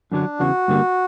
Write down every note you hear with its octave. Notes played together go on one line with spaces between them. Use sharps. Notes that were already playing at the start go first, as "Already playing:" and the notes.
F#2 D3 F#3 D4
E2 C#3 E3 F#4
G2 D3 G3 A#3